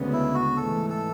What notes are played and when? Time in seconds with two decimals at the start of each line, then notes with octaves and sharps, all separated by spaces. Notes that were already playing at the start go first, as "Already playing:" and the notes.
Already playing: D2 C#3 G#3 B3
0.13 E4
0.34 F#4
0.56 G#2 E3 A3 A4
0.90 A4